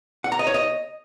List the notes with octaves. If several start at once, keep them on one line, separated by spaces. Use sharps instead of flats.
F#5
A#5
D#5
C#5
D#5